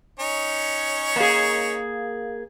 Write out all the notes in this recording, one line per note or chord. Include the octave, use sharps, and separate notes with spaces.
C#4 D#4 C#5
A#3 G#4